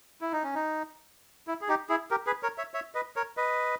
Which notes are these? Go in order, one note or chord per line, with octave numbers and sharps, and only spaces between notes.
E4
D#4
C#4
D#4
E4
G#4
D#4 G4
E4 G#4
G4 A#4
G#4 B4
A#4 C#5
C#5 E5
C#5 E5
B4 D#5
A#4 C#5
B4 D#5